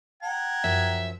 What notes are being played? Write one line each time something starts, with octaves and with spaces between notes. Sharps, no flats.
F#5 G5 A#5 G#6
F#2 F3 E5